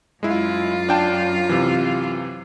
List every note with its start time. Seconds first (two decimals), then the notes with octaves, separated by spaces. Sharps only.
0.23 F#2 G#3 E4 F4
0.89 D4 G5 A5
1.49 C3 E3